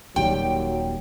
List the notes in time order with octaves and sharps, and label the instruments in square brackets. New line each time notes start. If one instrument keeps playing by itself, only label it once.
[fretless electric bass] D#1 D#2 G3 [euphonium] F#3 [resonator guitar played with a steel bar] G5